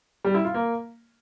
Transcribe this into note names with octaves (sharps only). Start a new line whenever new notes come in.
G3
E4
F4
A#3